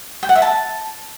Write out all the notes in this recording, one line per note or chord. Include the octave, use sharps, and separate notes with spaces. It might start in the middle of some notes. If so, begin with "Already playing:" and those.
G5
F#5
E5
A5